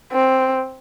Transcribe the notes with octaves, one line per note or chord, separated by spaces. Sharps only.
C4